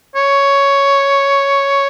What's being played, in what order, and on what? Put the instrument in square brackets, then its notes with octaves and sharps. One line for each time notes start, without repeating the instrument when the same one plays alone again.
[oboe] C#5